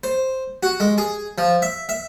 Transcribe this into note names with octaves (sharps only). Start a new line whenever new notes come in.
C5
F#4
G#3
G#4
F3
E5
E5